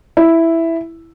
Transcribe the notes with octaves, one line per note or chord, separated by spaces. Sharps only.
E4